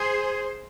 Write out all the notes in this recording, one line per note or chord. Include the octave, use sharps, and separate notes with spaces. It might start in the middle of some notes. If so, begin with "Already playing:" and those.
Already playing: G#4 C5